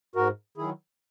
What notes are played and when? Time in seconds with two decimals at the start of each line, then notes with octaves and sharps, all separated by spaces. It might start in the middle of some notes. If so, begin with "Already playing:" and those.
0.15 G#2 F#4 A#4
0.57 D#3 F#3 E4 G#4